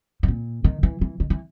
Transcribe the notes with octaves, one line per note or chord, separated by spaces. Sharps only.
G#2
A#2
D#3
E3
E3
D#3
E3